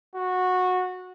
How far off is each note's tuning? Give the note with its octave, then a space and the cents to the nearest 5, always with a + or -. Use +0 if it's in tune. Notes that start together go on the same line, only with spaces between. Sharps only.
F#4 -15